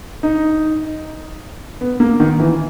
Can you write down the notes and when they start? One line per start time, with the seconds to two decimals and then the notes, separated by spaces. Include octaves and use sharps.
0.23 D#4
1.81 B3
2.00 A#3
2.20 D#3
2.40 E3